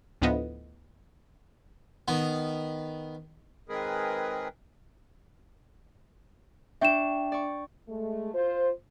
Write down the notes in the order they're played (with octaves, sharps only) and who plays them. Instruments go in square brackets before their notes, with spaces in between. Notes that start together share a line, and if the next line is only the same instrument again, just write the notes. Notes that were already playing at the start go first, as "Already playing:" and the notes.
[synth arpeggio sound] D2 A2 F3 B3 D#5
[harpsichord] D#3 B3
[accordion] D#3 G#3 C4 G#4 A#4 B4
[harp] D4 G5 C#6 [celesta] E5 E7
[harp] D5 C#6
[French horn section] G#3 A3
F4 C5